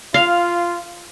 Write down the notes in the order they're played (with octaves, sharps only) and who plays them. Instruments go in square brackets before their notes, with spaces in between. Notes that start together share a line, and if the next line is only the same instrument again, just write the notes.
[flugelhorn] F4 [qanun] F5